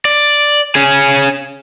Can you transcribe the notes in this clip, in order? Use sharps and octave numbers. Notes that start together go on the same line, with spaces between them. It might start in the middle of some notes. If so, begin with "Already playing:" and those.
D5
C#4 G#4